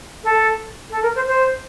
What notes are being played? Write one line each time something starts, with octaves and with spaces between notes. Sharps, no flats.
A4
A4
A#4
C5
C5